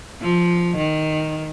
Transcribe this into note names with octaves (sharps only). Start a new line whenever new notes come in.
F3
D#3